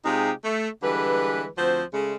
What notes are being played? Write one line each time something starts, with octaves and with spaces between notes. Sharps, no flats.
C3 G#3 D#4 F4 G4 G#4
A3
D3 E3 G3 G#3 B4
D2 F3 C4 F#4 C5
C#3 G#3 A3